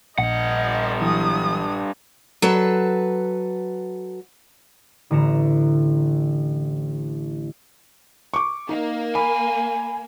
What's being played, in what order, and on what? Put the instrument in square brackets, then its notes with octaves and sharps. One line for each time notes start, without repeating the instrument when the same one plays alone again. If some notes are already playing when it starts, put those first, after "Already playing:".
[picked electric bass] A#1 [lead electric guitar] G2 F#5 [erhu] D#5
[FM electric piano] E3 F#3 E4 [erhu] D#6
[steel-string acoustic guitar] F#3 A4 B4
[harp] A1 D3 A#5 C#7 E7
[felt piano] C#6 D6
[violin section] A#3 [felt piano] D#4
[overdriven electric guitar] G#5 [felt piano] B5